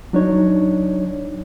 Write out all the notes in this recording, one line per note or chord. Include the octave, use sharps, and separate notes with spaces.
F#3 D4 D#4 C#5